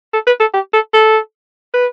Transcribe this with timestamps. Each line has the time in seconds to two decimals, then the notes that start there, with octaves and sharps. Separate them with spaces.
0.13 A4
0.27 B4
0.40 A4
0.54 G4
0.73 A4
0.93 A4
1.74 B4